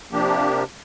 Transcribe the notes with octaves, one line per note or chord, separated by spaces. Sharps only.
C3 F3 A#3 D4 G4